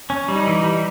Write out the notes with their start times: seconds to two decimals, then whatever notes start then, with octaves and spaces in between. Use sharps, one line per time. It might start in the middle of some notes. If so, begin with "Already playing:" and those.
0.10 C#4
0.28 G3 D#4
0.47 E3
0.64 G3